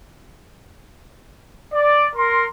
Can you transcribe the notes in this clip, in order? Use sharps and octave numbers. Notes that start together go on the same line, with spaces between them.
D5
A#4 C6